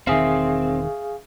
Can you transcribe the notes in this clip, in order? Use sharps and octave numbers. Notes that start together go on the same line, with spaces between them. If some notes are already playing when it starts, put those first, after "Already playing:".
E1 D#3 C4 G#4 E5 F5